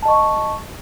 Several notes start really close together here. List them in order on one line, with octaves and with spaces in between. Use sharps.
A5 D#5 C#6